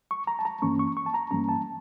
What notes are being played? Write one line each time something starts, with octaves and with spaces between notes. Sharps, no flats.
C#6
A#5
A5
A#5
G2 E3 A#3 C#4 C#6
C#6
C#6
A5
A#5
G2 E3 G3 A#3 C#4 A#5
A5